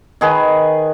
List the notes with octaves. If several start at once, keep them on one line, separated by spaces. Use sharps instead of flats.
D#3 G#4 B4